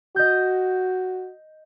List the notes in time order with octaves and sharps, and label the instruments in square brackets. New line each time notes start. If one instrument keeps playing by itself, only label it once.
[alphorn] F#4 [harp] D#5 G6